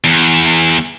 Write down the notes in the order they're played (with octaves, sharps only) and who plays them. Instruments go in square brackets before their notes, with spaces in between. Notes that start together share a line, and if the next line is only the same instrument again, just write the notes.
[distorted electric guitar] E2